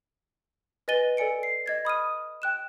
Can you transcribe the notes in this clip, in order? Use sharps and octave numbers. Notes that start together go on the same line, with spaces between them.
B4 D#5 G#5 A6 D#7 G7
A4 D5 G#5 C#7 D7
C7
D#5 G#6 A6
B5 D#6 F6 D#7
G5 F#6 E7